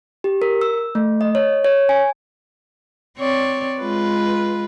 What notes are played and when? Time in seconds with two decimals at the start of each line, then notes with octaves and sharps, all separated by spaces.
0.24 G4
0.42 A#4
0.61 E6
0.95 A3
1.21 D#5
1.35 C#5
1.65 C#5
1.89 G#5
3.18 C4 C#5 D5
3.80 G#3 F4 B4